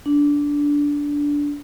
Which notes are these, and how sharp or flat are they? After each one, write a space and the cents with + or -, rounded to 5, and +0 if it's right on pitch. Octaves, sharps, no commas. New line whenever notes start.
D4 -15